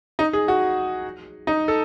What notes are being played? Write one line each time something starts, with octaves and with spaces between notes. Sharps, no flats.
D#4
G#4
F#4
D#4
A4